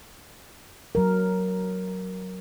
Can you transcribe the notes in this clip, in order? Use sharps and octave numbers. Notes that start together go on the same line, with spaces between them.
F#3 A#4